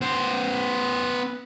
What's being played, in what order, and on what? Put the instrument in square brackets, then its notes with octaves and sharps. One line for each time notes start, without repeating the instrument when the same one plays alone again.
[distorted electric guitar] B3 C5